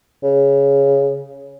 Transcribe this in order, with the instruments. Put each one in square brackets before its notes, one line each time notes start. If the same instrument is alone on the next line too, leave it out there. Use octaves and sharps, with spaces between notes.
[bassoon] C#3